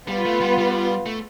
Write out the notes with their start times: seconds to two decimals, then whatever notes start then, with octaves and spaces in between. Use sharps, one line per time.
0.08 G3 B3 F4 B4
0.25 A3
0.41 G3
0.58 G3
1.06 A3